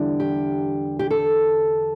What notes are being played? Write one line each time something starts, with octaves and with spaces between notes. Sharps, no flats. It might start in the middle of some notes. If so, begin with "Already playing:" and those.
Already playing: E2 D3 G3 D4
G4
G4
A4